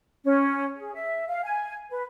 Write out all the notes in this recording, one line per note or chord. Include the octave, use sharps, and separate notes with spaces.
C#4
G#4
E5
F5
G#5
B4